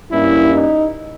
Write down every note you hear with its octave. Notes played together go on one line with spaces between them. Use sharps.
G2 G3 A#3 C#4 E4
D#4